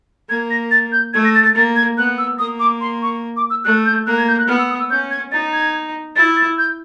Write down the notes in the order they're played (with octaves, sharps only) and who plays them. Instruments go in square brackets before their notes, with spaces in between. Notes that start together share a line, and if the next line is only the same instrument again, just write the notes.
[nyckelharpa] A#3 [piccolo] G#6
[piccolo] A#6
A6
G6
[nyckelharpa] A3 [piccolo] G#6
[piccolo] A#6
A6
A6
[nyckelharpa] A#3 [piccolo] A6
[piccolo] G#6
[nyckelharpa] B3 [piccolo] F#6
[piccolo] E6
[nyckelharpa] A#3 [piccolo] D#6
[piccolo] D6
C6
C#6
D6
E6
[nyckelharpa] A3 [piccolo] F#6
[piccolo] G6
[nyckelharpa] A#3 [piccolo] F#6
[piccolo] G#6
G6
F#6
[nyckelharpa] B3 [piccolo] F6
[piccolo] E6
D#6
E6
[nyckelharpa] C#4 [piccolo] G6
[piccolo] G#6
[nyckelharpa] D#4 [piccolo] A6
[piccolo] G#6
[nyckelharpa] E4 [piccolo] A6
[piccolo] A6
G6